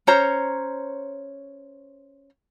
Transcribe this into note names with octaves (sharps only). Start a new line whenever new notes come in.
C#4 C5 C#5 A#5